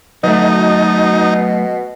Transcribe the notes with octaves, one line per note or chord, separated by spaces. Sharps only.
B2 F#3 A3 D#4